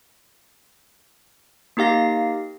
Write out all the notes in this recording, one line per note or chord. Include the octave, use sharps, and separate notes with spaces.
A#3 D#4 G4 F5 A#6